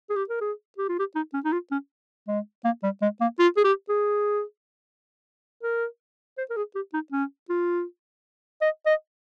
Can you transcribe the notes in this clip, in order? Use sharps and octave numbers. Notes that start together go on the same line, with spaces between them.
G#4
G4
A#4
G#4
G4
F4
G4
D#4
C#4
D#4
F4
C#4
G#3
A#3
G3
G#3
A#3
F4
G#4
G4
G#4
A#4
C5
A#4
G#4
G4
D#4
C#4
F4
D#5
D#5